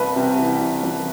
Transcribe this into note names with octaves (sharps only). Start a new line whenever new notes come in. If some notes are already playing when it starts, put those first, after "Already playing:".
Already playing: C2 B4
C3
E3
C3
C2